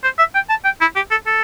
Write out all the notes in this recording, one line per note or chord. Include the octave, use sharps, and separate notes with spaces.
C5
E5
G5
A5
G5
E4
G4
A4
A4